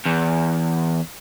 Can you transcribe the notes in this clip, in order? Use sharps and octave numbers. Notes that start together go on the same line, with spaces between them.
E2